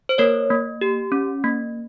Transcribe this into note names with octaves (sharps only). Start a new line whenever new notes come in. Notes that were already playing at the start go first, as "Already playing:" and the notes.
C5
A#3 A#4 C#5
A#3
G4
C#4
A#3